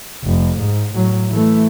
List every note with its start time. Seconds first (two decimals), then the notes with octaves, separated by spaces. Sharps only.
0.24 F1
0.59 G#2
0.93 A2 F#3
1.31 E3 A3